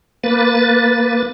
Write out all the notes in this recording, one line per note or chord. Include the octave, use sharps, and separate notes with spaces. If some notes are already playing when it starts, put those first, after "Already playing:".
A#3 B4 A6